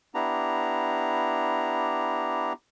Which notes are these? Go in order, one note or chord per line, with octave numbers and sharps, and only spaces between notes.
B3 D4 E4 G4 A#5